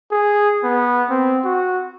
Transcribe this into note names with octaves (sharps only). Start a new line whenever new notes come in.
G#4
B3
C4
F#4